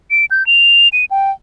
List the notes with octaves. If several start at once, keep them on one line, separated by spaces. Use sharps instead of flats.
D7
G6
F7
D#7
G5